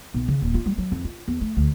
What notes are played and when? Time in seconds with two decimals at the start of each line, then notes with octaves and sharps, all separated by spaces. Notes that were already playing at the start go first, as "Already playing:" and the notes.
0.14 B1
0.28 C#3
0.42 D#1
0.54 F4
0.66 G3
0.78 F#3
0.92 F2
1.04 F4
1.28 E2
1.41 A3
1.57 D2